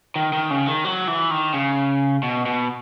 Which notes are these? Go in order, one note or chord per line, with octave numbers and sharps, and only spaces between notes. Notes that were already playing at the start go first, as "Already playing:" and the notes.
D#3
D#3
C#3
D#3
F#3
E3
D#3
C#3
B2
B2